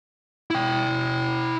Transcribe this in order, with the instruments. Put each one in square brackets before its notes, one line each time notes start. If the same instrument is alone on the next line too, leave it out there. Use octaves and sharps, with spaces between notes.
[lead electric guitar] E4 G5